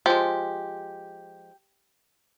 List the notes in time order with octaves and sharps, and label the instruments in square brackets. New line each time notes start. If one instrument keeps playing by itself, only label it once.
[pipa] F3 G#3 [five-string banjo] G4